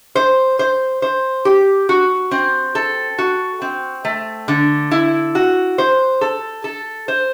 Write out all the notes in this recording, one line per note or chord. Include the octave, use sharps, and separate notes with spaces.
C5
C5
C5
G4
F#4
C4
A4
F#4
C4
A3
D3
E4
F#4
C5
A4
A4
C5